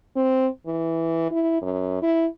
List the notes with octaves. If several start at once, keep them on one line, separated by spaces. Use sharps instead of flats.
C4
E3
E4
F#2
E4